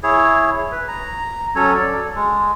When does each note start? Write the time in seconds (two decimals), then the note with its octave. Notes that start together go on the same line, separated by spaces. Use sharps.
0.03 E4 G#4 C#5
0.72 B4
0.88 A#5
1.55 F#3 C#4 A4 C#5
1.75 A4 D5
2.15 G#3